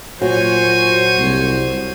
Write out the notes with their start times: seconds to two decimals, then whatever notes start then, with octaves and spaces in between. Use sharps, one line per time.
0.22 A#2 F#3 F#4 C5 C#5 G#5
1.18 C2